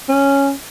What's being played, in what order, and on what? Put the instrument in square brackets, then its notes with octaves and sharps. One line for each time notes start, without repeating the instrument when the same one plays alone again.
[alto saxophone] C#4